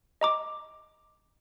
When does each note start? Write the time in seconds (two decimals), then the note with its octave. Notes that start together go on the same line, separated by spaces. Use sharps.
0.21 D#5 A#5 D6